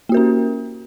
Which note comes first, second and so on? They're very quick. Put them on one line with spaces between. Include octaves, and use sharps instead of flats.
A#3 F#4 A#4 C#4